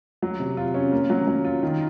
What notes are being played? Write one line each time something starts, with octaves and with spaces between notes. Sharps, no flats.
F#3
C3
F4
C#4
A#3
F#3
F#3
F4
D#3